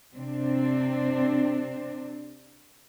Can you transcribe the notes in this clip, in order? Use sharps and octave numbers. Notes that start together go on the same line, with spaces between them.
C3 C4 D4